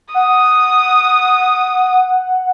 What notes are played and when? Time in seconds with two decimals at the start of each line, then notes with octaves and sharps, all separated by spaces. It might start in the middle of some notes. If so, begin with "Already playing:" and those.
0.14 F#5 D#6